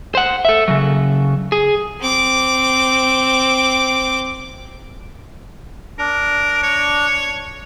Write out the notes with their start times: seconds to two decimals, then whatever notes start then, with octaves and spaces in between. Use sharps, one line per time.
0.15 C5 F#5
0.45 A4 E5
0.68 C#3 F#3
1.52 G#4
2.00 C4 D6
5.99 D4 A#4
6.63 C#5